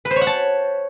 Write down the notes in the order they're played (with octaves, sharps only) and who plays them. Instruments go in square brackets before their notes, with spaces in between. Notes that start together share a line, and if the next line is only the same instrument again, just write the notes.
[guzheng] B4
C5
C#5
F#5
A5